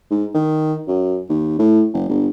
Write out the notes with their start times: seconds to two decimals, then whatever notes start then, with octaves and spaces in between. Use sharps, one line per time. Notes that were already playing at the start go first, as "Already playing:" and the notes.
0.11 G#2
0.34 D#3
0.88 F#2
1.29 D#2
1.59 A2
1.93 F#1
2.09 G1